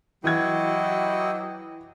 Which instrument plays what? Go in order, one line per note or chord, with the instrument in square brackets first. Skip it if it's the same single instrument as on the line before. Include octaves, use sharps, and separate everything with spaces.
[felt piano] E3 G#6 [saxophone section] F#3 G4 D#5 [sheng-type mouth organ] E4 F#4 G5